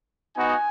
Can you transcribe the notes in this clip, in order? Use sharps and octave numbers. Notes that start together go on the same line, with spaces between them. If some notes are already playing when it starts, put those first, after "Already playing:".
B3 D#4 F#4 G#5